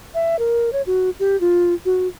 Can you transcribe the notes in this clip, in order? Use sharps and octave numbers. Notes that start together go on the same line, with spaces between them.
E5
A#4
C#5
F#4
G4
F4
F#4